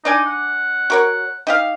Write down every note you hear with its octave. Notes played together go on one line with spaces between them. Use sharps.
D4 D#4 D5 G#5
F#5
F#4 A#4 C#5
D#4 G4 F5